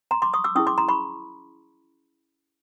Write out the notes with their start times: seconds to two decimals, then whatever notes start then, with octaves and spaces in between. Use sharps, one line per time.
0.11 A#5 C6
0.22 C6 D6
0.34 C#6 D#6
0.44 D6 E6
0.55 C#4 E4 G#4 C#6 D#6
0.67 C6 D6
0.78 A#5 C6
0.88 B5 C#6